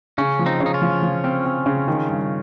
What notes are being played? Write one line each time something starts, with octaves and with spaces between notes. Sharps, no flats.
C#3 C#4
F3
C4 D#4
C#3
D#4
C#4 F4
F3
F3
C4
C4
C#3
D#3
G2